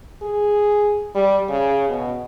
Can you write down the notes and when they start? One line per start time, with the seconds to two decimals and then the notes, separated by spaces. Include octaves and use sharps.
0.22 G#4
1.15 G3
1.49 C#3
1.89 B2